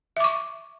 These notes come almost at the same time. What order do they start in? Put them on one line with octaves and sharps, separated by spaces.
E5 D6 C#6